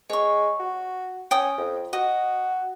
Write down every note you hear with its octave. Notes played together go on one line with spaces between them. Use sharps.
G#3 C#5 C#6
F#4
C#4 G5 D#6
F2
F#4 D#5